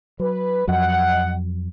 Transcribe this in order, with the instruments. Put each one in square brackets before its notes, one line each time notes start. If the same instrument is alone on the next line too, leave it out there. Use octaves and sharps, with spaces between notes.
[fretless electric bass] F#3 [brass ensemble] B4
[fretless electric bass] F2 F#3 [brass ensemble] D#5 F#5